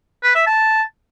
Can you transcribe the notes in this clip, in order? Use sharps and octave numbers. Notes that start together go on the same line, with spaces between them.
B4
E5
A5